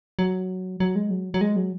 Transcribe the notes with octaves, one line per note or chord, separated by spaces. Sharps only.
F#3
F#3
G#3
F#3
F#3
G#3
F#3